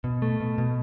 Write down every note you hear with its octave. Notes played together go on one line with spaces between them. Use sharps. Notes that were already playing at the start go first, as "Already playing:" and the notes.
B2
A3
B2
B2